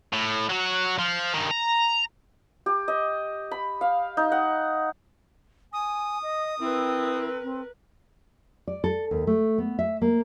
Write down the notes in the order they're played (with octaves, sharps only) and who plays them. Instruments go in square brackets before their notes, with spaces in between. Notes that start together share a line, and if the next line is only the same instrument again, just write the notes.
[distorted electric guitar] A2
F#3 F#4
F3
G2 D#3
A#5
[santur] G4
D#5
B5
F5
D#4
F#5
[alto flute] G#5 [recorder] D#6
[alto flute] D#5
[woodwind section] C4 [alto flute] E4 [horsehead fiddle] A#4 B4
[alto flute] C4
[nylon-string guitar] D5
A4
D#2
A3
B3
E5
A#3